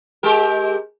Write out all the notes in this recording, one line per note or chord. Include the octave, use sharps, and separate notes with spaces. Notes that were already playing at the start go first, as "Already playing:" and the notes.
G#3 G4 A#4